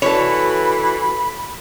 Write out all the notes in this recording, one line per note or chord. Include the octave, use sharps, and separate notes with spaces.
E3 F#4 A4 C#5 B5